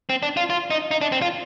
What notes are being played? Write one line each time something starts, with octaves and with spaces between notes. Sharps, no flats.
C4
D4
F4
F4
D#4
D#4
D4
C4
F4